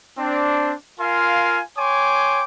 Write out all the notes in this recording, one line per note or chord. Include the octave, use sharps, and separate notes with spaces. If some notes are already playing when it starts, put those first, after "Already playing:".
C4 D4
F4 A#4 F5 G#5 C6
C#5 G5 G#5 C6 D6